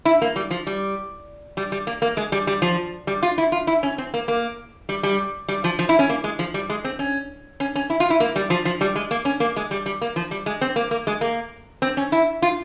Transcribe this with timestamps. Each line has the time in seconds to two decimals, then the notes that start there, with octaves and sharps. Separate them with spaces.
0.05 E4
0.22 A#3
0.36 G3
0.51 F3
0.67 G3
1.57 G3
1.72 G3
1.87 A#3
2.02 A#3
2.17 G#3
2.32 G3
2.47 G3
2.62 F3
3.07 G3
3.23 F4
3.38 E4
3.52 F4
3.67 E4
3.83 C#4
3.98 C4
4.14 A#3
4.28 A#3
4.89 G3
5.03 G3
5.48 G3
5.64 F3
5.79 F3
5.89 E4
5.99 C#4
6.09 A#3
6.24 G#3
6.39 F3
6.54 G3
6.70 G#3
6.84 C4
6.99 C#4
7.60 C#4
7.76 C#4
7.90 E4
8.00 F4
8.10 E4
8.20 A#3
8.36 G3
8.50 F3
8.65 F3
8.81 G3
8.96 G#3
9.11 A#3
9.25 C#4
9.40 A#3
9.56 G#3
9.71 G3
9.86 G3
10.01 A#3
10.16 F3
10.31 G3
10.46 G#3
10.61 C4
10.76 A#3
10.91 A#3
11.07 G#3
11.21 A#3
11.82 C4
11.97 C#4
12.12 E4
12.42 F4